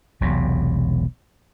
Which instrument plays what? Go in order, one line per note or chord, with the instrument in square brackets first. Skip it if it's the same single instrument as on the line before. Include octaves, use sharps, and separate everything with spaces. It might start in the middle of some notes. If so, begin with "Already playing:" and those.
[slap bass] E1 B1 C3 F#3